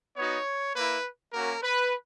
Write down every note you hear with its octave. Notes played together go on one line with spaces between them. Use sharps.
B3 D#4 F#4 C#5
A#3 E4 B4
A#3 C#4 F#4 A#4
B4